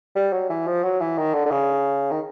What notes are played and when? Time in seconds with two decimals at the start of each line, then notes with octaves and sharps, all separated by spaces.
0.16 G3
0.33 F#3
0.50 E3
0.67 F3
0.83 F#3
1.00 E3
1.18 D#3
1.34 D3
1.46 D3
1.51 C#3
2.11 D#3